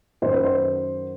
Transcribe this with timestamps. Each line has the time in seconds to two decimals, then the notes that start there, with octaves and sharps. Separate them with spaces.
0.22 F#2 D#3 F#3 C5
0.34 B4
0.44 C5